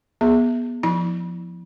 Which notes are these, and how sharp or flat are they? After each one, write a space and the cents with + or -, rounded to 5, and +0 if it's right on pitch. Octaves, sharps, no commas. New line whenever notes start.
B3 -25 G#4 +0 E5 +0
F3 +0 E4 -30 B5 -30